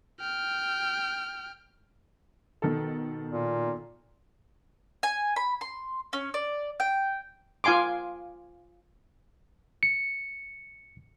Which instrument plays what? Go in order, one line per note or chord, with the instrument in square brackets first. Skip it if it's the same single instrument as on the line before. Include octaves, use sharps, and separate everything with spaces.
[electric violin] G5 F6
[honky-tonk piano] B2 D#3 A4
[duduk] A#2
[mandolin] G#5
B5
C6
C#4
D5
G5
[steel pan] F4 F5 G#5 C6 D6
[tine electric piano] C#7